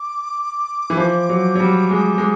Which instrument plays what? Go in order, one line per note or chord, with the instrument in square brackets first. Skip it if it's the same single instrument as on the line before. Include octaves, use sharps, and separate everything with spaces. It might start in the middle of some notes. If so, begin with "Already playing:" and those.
Already playing: [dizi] D6
[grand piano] E3
F3
F#3
F#3
G3
G#3
G#3